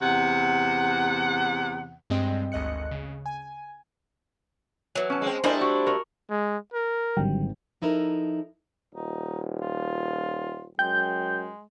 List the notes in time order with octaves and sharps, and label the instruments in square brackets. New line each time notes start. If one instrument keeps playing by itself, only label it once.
[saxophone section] E2 C3 F#5
[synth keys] G2 G3 G#3 C4 D#5 G5
G#1 D2 D#5 F#6 C#7
C#3
G#5
[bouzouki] E3 F#3
[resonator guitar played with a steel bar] C#4 A5
[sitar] G#3 C4
[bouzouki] G3 A3 E4 [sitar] D4 C5 [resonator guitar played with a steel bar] A#4 D#5 G#5
[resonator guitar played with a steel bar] F#4
F#4 A#4
[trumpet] G#3
A#4
[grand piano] G#1 G5 [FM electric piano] D3 F#3 G3
[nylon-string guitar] F3 D#4 E4 A4 A#4
[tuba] D#1 [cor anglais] D#4
[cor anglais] F4
[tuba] F#2 [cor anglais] G#3 [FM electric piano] G5 G6